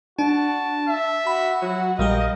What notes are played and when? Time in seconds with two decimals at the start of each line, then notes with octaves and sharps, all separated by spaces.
0.19 D4 F#4 A5
0.89 E5
1.27 F#4 B5
1.62 F#3 F#5
1.99 A#1 G3 G4 A#4 D#5 F5